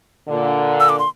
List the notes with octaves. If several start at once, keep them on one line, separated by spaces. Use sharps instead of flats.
A#2 D3
E6
D6
C6